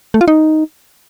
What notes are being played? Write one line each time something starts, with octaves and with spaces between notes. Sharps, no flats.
A3
F4
D#4